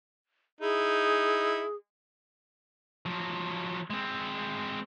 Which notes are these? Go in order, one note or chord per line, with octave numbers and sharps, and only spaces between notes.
D#4 E4 G#4
F3 F#3
G#3 C4